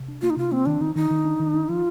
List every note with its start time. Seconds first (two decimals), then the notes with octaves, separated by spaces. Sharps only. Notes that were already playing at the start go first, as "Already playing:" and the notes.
Already playing: C3
0.08 D4
0.22 A#3 F4
0.30 D#4
0.37 C3 F4
0.52 A#3 C4
0.66 D#3 D4
0.81 D#3 D#4
0.96 D#3 D#4
1.11 D#3
1.25 D4
1.40 D#3
1.54 D4
1.68 F3 F4